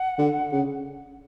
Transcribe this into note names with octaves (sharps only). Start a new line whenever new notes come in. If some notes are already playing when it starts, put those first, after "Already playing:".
Already playing: F#5
D3
C#3